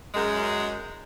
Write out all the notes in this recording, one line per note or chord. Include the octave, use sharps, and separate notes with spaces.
F#2 G#3